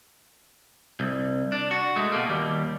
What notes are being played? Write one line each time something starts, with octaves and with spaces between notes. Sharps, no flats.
C2
D4
F#4
G#3 A3
B2 A#3
D#2 G3